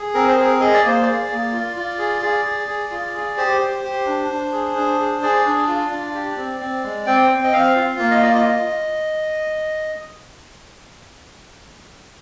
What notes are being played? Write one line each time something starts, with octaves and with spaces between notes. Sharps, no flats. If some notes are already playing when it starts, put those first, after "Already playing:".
Already playing: G#4
C4 A#4
C5
G#4 A#4
G#4 D#5
D5
A#3 C5
G#4 D5
A#3
F4
F4
G#4
G#4
G#4
G#4
F4
G#4
G4 C5
G4
G4
D4
D4
G#4
D4
G#4
G#4 D5
D4
F4
D4
G4
C4
C4
G#3
C4 G5
C4
D#5
C4 F5
F4
A#3 F5
D#5
F4 D5
D#5
F4